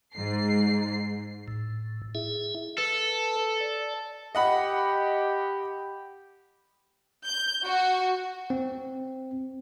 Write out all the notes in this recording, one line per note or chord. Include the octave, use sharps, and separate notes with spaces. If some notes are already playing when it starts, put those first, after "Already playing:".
G#2 C7
A2
E4 G#4 E5
A4 B4
D5
G4 D#5 F#5 B5
G6
F#4
C4